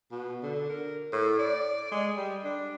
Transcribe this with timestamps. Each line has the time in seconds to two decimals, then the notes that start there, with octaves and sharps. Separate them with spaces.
0.11 B2
0.43 D3
0.69 A#4
1.13 A2
1.39 D5
1.92 G#3
2.17 G3
2.44 D4